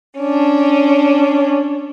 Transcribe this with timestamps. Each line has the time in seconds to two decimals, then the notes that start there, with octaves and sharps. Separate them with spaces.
0.19 C#4 D4